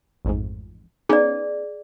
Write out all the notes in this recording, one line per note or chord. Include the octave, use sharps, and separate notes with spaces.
A1 F2 G#2
B3 C#4 D#4 G#4 D5